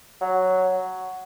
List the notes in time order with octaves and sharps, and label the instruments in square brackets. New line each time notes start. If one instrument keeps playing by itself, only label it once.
[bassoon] F#3